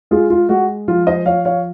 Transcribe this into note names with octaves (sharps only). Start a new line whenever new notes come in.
G#3 F4 G#4
F4
G#3 F#4
F3 F4
C5 D#5
F3 C#5 F5
C#5 F5